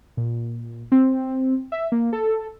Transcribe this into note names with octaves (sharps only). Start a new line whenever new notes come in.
A#2
C4
E5
A#3
A4